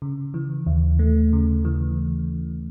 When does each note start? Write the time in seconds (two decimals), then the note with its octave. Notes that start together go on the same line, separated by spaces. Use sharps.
0.02 C#3
0.34 E3
0.67 D#2
0.99 A3
1.33 C#3
1.65 E3